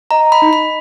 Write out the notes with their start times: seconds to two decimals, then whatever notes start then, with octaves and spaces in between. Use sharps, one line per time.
0.11 D#5 A#5
0.32 B5
0.42 D#4
0.53 B5